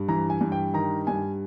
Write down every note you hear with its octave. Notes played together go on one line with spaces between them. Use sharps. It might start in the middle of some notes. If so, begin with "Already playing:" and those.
Already playing: G2
E3 A#5
G#5
G2
G5
D#3 A#5
G2 G#5